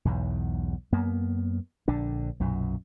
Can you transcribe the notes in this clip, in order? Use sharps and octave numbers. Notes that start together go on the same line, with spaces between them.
B1 E2 G#2
F#2 A#3 B3
A#1 D3 D4
B1 F#2 A#2